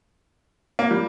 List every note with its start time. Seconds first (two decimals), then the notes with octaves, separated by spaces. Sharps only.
0.79 A#3
0.91 G3